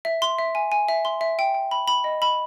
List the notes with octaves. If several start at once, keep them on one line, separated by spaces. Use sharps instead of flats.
E5
C6
E5
G#5
G#5
E5
C6
E5
G5
G5
B5
B5
D#5
B5